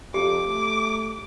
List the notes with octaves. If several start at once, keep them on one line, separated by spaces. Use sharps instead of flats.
F2 G4 D6
A3